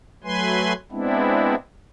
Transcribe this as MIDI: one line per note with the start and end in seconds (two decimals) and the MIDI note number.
0.24 0.73 54
0.24 0.73 57
0.24 0.73 71
0.24 0.73 80
0.24 0.73 84
0.92 1.55 56
0.92 1.55 59
0.92 1.55 60
0.92 1.55 62
0.92 1.55 64